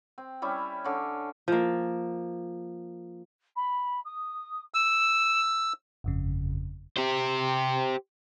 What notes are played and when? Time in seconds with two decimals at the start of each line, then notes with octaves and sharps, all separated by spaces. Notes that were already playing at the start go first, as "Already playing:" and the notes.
0.18 C4
0.42 G3 C#4 E4
0.84 D3 C#4
1.48 F3 A#3
3.56 B5
4.04 D#6
4.74 E6 E7
6.04 G1 F2 C#3
6.97 G4 C5